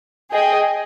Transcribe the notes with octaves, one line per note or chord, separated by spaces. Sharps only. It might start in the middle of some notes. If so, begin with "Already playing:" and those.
G#4 D#5 G5